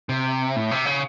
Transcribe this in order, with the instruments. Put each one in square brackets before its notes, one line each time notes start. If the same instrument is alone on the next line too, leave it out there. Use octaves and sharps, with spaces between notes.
[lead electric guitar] C3
A2
C3
C#3